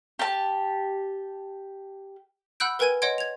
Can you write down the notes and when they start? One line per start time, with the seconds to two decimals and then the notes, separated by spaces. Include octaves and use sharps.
0.19 G4 A5
2.60 F#5 B5 E6 F#6 G6 D7
2.79 A#4 B4 G5 G#5 G#6 D#7
3.02 C#5 D#5 F#5 C6 G#6 D7
3.18 G#6 F7